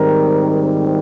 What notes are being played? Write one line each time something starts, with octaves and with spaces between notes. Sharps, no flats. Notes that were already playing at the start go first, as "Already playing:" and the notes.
Already playing: G#2 D#3 G3 C4 A#4